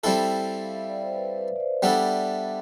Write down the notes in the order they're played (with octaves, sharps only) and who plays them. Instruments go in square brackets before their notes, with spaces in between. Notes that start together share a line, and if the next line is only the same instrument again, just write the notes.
[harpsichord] G3 C4 E4 A4 [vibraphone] E5
[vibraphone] F5
E5
D5
C5
B4
B4
D5
C5
[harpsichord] G3 B3 D4 A4 [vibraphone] E5
[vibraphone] E5
E5